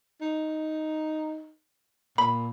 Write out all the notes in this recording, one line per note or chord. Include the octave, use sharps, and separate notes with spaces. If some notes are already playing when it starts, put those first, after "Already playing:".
D#4
A#2 B5